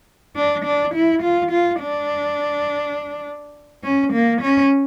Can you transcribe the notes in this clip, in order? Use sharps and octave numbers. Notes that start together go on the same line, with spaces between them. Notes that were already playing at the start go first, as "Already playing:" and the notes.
D4
D4
E4
F4
F4
D4
C#4
A#3
C#4